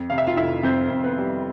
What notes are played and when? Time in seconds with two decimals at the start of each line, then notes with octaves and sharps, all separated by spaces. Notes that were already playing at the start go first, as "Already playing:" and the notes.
Already playing: F2
0.10 C3 F5
0.18 E5
0.27 F4 F5
0.37 F1 E4 E5
0.63 F2 C4 C5
0.90 F2
1.04 B3 B4
1.18 G3